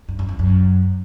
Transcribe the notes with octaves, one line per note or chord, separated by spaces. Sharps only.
G2
F#2
F2
F#2